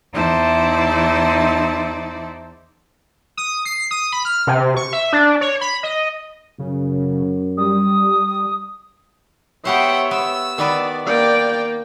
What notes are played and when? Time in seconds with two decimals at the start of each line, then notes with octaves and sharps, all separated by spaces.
0.13 E2 D#4 E4 C5 D5 A5
3.37 D#6
3.65 C7
3.91 D#6
4.13 B5
4.25 F6
4.47 C3
4.77 C#6
4.93 E5
5.13 D4
5.41 C#5
5.61 B5
5.83 D#5
6.59 F#2 C#3
7.57 G3 D#6
9.65 B3 G4 C5 C#5 E5 F#5 G5
10.11 B3 E6
10.58 D#3 B3 B4 D5
11.07 A#3 D5 G5